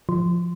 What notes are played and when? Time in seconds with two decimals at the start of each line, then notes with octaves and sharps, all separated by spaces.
0.09 F3